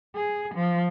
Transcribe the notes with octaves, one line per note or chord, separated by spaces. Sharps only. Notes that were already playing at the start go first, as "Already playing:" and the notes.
G#4
F3